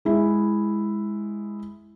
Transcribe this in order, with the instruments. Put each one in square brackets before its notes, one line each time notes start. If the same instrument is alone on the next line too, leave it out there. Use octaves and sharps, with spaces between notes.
[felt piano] G#3 E4